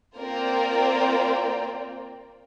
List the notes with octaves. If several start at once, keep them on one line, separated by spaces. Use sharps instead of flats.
A#3 C4 F4 A#4 D5 G5